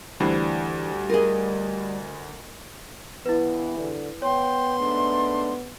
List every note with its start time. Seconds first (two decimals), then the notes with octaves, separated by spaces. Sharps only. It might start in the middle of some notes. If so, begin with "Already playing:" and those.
0.20 D2 E3 G3 D4 C5
1.10 F4 G#4 A#4 D#5
3.26 E2 G2 E3 B3 E4 B4
3.79 D3
4.22 B3 C#5 G5 C6
4.79 G#2 A3 D4